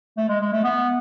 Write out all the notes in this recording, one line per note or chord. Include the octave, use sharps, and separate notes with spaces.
A3
G#3
G#3
A3
B3